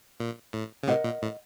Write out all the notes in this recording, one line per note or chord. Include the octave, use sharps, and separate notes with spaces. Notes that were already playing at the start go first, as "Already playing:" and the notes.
A#2
A2
C#3
A2 C3 A#4 D#5 F#5
A#2
A2